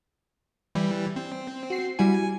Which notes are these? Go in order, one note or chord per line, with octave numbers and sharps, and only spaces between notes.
E3 G3
C4
F#4 C7
G3 E4 F#4 G#5